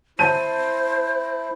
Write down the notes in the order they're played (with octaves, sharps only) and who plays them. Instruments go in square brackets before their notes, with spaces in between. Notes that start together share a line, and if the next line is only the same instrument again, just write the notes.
[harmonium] E4 [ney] C5 [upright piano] A5 G6 D#7